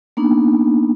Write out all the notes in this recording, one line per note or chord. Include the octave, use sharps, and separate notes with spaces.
A#3 B3 D4 D#4